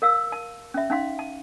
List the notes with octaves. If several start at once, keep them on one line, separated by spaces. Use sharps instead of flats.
A#4 F5 E6
A5
C#4 E5
C#4 D#4 F5 C6
A5